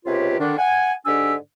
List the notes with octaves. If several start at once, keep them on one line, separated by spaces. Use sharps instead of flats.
C#2 C3 F4 G4 B4 C#5
D3 D#3 D4
F#5 G#5
G#2 D3 D4 G4 G#5 E6